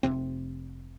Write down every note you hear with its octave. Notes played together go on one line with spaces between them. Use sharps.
F1 C#2 C3 C4